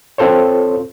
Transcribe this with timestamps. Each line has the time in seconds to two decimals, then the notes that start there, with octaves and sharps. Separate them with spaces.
0.18 C4 F4 A4 C5 C#5